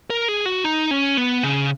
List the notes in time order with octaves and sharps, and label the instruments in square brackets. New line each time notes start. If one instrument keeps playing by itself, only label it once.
[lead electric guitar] A#4
G#4
F#4
D#4
C#4
B3
C#3